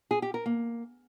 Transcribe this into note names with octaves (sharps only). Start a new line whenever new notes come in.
G#4
G4
A#4
A#3